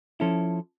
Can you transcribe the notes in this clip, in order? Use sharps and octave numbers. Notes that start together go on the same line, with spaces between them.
F3 C#4 E4 A4